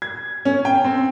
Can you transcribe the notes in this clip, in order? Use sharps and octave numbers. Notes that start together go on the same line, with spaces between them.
G#6
C#4
G5
C4